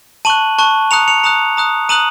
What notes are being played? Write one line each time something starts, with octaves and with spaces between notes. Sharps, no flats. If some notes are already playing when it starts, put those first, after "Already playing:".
A5 C#6 F#6 D#7 F#7
A5 C#6 F#6
A#5 D#6 F#6 C#7 F7
C#7 F7
A#5 D#6 F#6 C#7 F7
A#5 D#6 F#6
A#5 D#6 F#6 D#7 F#7